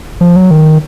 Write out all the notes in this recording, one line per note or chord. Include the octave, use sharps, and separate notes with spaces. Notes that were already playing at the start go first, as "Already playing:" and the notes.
F3
F#3
D#3